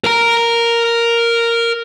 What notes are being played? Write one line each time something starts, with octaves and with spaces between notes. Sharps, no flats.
A#4 A#5